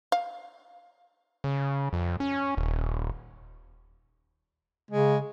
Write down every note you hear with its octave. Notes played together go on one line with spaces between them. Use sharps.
F5
C#3
F2
C#4
D#1
C#3 G#3